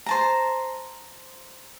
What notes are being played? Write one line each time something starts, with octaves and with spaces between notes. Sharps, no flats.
C5 A5 A#5